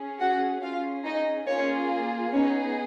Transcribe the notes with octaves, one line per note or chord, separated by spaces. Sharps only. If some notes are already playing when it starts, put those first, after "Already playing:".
Already playing: C#4 G#4
F#4 F#5
C#4 F4 G#4 F5
D#4 D#5
A#3 C#4 F4 G#4 C#5
B3 C#4 D#4 G#4 C#5